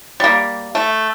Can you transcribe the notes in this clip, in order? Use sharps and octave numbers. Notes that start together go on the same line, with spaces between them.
G3 A#3
A3